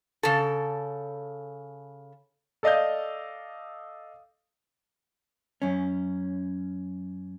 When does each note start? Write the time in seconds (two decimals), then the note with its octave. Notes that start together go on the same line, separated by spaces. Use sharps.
0.23 C#3 A4
2.63 A4 D5 D#5 F5 D#6 G6
5.62 F#2 C#4